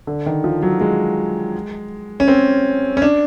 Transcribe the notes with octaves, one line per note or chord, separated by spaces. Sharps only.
D3
D#3
F3
F#3
G#3
C#4
C4
C#4
D4